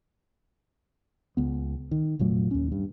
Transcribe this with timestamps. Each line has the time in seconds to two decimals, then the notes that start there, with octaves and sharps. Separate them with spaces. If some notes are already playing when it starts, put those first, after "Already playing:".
1.37 C#2 B3
1.91 D#3
2.19 F1 A#2 F#3 A3
2.51 D#2 C#4
2.72 G2